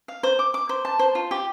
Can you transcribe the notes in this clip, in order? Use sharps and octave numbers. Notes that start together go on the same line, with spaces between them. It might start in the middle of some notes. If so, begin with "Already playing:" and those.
F5
C5
D6
D6
C5
A5
C5
F4
G4